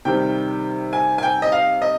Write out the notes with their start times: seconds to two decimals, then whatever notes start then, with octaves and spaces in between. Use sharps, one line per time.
0.05 C3 D#3 G3 G5
0.93 G#5
1.18 G#5
1.23 G5
1.42 D#5
1.52 F5
1.82 D#5